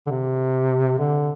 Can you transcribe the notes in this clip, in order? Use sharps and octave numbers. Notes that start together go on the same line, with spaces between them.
D3
C3
D3